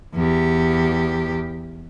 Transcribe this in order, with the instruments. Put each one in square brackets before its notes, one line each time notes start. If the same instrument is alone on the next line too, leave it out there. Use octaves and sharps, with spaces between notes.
[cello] E2 G4